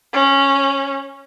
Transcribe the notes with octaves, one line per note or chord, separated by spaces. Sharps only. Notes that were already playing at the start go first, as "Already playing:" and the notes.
C#4